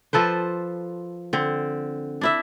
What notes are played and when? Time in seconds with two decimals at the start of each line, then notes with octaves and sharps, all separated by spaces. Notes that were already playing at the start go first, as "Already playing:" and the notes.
0.13 F3 A4 B4 C5
1.33 D3 C4
2.21 D4 E4 E5